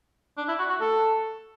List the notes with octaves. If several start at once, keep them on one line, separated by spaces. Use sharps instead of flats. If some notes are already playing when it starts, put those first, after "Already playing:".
D4
E4
F#4
F#4
A4